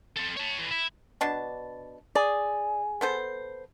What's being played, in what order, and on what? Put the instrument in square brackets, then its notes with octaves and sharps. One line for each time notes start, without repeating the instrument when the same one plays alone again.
[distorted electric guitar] C4 A4
C#5 A5
A2 E3
E4
[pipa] B2 D4 A5
[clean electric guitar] G#4 [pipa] D5
[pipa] B3 A4 C5